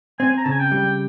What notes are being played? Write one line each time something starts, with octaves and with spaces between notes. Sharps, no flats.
C4 G#5
A#5
C#3 A5
G#5
G5
G3